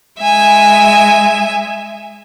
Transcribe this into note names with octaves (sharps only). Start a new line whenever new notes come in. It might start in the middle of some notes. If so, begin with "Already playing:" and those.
G#3 E5 G#5